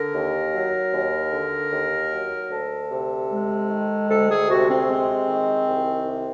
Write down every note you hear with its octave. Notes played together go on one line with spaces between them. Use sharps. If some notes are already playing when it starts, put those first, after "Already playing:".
Already playing: D3 A#4
D#2
F#3
D#2
D3
D#2
F#3
D2 A4
C3
G#3
D#3
D2 A4
G#4
C3 F#4
C4
G#3 C4
D#3
C2
C3